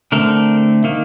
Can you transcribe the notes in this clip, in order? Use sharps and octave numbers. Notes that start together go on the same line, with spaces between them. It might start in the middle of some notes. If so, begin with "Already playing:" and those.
D3 A3 C4 A#4
D#3 A#3